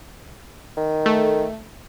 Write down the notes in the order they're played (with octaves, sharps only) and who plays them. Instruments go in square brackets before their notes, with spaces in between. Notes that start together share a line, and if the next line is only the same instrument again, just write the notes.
[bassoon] D#3
[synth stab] A3